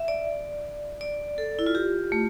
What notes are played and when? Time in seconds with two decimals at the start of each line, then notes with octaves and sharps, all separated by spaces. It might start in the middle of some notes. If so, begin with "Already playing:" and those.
Already playing: E5
0.08 D5
1.01 D5
1.38 A4
1.59 E4
1.66 F4
1.75 G4
2.12 A3